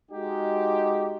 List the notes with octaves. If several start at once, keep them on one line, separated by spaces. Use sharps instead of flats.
G#3 D#4 F#4 G4